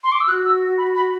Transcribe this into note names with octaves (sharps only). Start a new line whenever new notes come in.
C6
D6
E6
F#4 F#6
E6
B5
B5